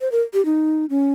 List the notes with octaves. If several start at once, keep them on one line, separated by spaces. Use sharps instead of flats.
C5
A#4
G4
D#4
C#4